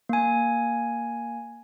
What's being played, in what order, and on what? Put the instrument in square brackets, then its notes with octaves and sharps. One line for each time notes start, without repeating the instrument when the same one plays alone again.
[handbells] A#3 G#5